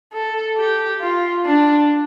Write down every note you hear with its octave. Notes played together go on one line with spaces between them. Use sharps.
A4
G4
F4
D4